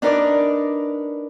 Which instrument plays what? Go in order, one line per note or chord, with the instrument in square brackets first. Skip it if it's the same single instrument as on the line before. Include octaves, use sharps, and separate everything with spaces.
[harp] D4 D#4 A#4 B4 D5 D6